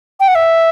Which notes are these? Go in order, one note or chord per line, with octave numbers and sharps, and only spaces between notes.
G5
F#5
E5